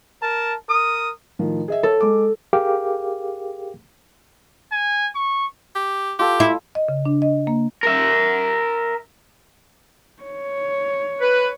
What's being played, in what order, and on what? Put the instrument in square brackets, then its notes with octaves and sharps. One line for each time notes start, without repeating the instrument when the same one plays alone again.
[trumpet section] A#4 A5
A#4 D#6
[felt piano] A2 D#3 F3
G#4 D#5 E5
[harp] A4 [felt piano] C#5
[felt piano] G#3 D6
[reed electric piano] G4 G#4 A#4 F5 G5 D6
[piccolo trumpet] G#5
C#6
[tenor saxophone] G4
[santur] F4 A4 [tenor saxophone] G4
[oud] E4
[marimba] D#5
C#3
D4
D#5
A#3
[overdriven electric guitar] A#4 E5
[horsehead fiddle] C#5
[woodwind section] B4